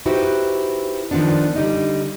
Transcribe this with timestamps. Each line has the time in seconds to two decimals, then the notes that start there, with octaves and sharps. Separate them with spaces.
0.06 D#4 E4 F#4 G4 B4 C5
1.11 D#3 F3 F#3 B3 D4
1.55 D3 G3 D#4